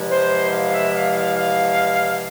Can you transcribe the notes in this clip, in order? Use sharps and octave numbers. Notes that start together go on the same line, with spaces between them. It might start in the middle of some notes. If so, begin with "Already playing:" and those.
Already playing: E2 C3 F3 G#3 E4
C5
F5
E5
F5
F5
F5